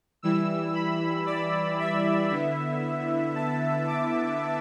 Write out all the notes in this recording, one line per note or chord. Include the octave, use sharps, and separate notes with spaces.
E3 G3 E4 E6
B5
D5
E5
D3 B3 E4
A5
D6